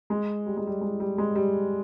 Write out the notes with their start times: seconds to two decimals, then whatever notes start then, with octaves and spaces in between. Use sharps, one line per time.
0.10 G#3
0.46 G3
0.57 G#3
0.67 G3
0.81 G#3
1.00 G3
1.18 G#3
1.36 G3